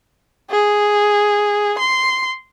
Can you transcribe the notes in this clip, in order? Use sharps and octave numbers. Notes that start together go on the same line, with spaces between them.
G#4
C6